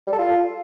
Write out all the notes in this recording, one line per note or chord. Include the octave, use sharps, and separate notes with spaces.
G3
A4
F4